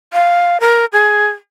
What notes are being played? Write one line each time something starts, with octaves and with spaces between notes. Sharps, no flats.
F5
A#4
G#4